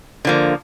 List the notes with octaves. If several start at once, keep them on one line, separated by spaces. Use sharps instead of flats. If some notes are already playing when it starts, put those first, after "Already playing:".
D3 F3 A#3